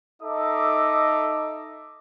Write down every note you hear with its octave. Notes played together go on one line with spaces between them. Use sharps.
D#4 A4 D#5 E5 D6